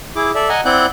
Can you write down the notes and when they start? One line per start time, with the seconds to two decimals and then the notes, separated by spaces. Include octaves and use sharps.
0.16 E4 G#4 D6
0.35 A4 D5 E5
0.49 D#5 F#5 G#5 A#5
0.65 C4 E4 D5 F#5 F#6 G6